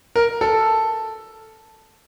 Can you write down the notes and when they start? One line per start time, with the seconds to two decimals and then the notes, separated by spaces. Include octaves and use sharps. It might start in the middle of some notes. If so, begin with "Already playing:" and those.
0.16 A#4
0.41 A4